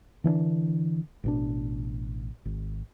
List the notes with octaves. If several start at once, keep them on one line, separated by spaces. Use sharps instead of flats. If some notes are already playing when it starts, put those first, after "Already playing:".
D3 E3 B3 D4
A1 B2 D4
G#1